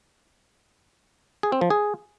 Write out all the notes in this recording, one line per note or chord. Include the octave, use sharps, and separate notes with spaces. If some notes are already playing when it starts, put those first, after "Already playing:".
G#4
C4
F3
G#4